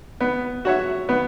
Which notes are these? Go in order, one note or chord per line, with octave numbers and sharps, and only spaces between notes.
B3
F#4 C#5 E5
B3